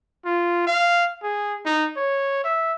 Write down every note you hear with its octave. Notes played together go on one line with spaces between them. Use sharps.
F4
F5
G#4
D#4
C#5
E5